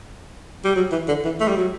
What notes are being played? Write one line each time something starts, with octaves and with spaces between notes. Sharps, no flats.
G3
F#3
E3
D3
E3
A3
G3
F#3